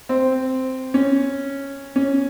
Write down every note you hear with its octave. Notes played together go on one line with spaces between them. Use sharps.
C4
C#4
C#4